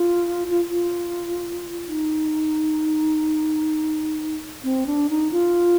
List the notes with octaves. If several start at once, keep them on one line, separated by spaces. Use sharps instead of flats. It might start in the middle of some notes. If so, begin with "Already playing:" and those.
Already playing: F4
F4
F4
D#4
C4
D4
D#4
F4